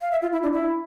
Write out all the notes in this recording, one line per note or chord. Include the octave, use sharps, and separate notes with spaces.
F5
E5
F4
E4
D4
E4